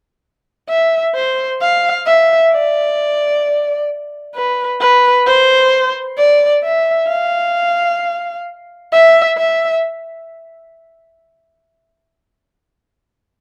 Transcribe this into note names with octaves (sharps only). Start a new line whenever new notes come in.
E5
C5
F5
E5
D5
B4
B4
C5
D5
E5
F5
E5
E5